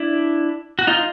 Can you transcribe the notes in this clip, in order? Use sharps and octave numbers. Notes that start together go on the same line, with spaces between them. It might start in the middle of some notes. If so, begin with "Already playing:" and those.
Already playing: D4 E4
F#4
D#4 F4